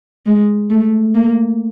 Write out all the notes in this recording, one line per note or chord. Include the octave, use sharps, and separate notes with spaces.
G#3
A3
A#3